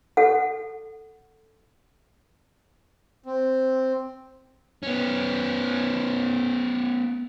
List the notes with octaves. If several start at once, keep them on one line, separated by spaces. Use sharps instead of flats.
A4 F#5
C4
B3 C#4